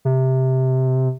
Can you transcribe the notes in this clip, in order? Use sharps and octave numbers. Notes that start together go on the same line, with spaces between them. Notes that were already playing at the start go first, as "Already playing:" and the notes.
C3